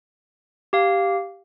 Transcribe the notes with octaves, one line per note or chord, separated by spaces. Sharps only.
G4 F5